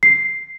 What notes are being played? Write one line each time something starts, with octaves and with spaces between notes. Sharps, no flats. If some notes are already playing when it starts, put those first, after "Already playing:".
C7